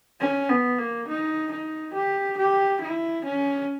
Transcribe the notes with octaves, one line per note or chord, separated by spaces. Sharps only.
C#4
B3
A#3
D#4
D#4
G4
G4
E4
C#4